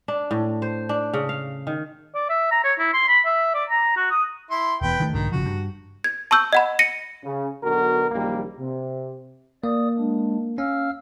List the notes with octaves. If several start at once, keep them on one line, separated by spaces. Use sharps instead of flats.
D4
A2
C5
D4
C#3
F5
D#3
D5
E5
A#5
C#5
E4
C6
B5
E5
D5
A#5
F#4
D#6
E4 C6
E1 E2 B4 G5
D#3 E3 A3
B1 G#2 D3 D#3
G1 C#3 F3 F#4
G2
G#6
A5 C#6 E6 G6
D#5 F#5 B5
A#6 C#7 D#7
C#3
B1 B2 D3 F#4 A#4
A#1 F#2 D#3 G3 A#3
C3
A#3 D5 D#6
G#3 D4
C#4 F5 E6 F6